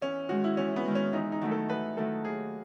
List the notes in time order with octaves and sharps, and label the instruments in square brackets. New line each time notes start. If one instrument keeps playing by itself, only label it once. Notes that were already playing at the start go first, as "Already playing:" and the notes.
[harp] E2 [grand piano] C#4
[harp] D#3 G#3 [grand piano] F#4
[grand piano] E4
[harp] E2 [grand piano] C#4
[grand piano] B3
[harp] D#3 G#3
[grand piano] C#4
[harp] E2 [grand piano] D#4
[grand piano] D#4
[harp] D#3 F#3 A3 E4
[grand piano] A4
[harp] E2 [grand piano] B4
[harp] D#3 F#3 A3 E4 [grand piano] A4
[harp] D#2 [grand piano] G#4